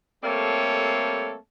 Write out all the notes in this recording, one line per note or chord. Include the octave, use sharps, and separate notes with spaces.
G3 A3 A#3 C4 A4 C#5